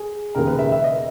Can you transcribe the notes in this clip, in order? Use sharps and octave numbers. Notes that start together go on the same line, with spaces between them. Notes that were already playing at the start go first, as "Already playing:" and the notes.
Already playing: G#4
E1 D#2 C#3 A#4
B4
E5
E5
D#5